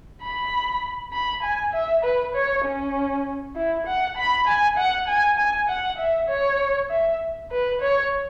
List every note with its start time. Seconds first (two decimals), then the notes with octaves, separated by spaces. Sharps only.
0.22 B5
1.12 B5
1.43 G#5
1.73 E5
2.04 B4
2.35 C#5
2.65 C#4
3.56 E4
3.86 F#5
4.17 B5
4.48 G#5
4.77 F#5
5.08 G#5
5.38 G#5
5.69 F#5
5.98 E5
6.29 C#5
6.90 E5
7.51 B4
7.81 C#5